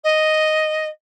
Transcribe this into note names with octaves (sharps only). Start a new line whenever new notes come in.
D#5